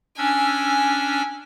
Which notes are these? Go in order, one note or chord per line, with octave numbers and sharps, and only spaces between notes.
C#4 D4 G#5 E6